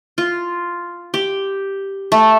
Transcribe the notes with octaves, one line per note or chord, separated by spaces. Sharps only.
F4
G4
A3